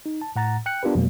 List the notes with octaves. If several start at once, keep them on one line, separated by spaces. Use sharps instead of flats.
D#4
A5
A2 F#5 A#5 A6
G5 F#6 C#7
B3 D4 F4 G4 A#4 B4
F2 B2 F#3 G#3 A#3